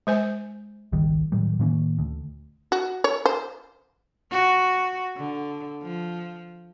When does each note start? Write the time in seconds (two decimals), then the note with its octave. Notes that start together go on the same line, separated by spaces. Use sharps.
0.07 G#3 C5 G#5
0.92 G#1 C#2 D#3 G3
1.32 A2 D#3 F#3 G3
1.59 A2 D#3 A#3 C#4
1.99 D2
2.72 F#4
3.04 C#5
3.26 C5
4.31 F#4
5.17 D3
5.82 F3